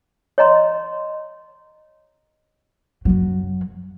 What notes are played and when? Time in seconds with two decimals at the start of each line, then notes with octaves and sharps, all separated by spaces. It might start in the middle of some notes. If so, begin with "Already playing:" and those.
0.38 C#5 D#5 A#5 C6
3.05 F#2 F#3